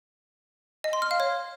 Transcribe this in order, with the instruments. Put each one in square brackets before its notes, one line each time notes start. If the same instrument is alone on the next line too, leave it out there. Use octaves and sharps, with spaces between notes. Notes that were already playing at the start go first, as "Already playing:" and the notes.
[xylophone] D#5
C6
F6
F5
C#5